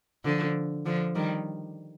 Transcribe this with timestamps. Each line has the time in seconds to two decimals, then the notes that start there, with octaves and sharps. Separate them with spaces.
0.25 D3 F3
0.86 D3 F3
1.15 D#3 G3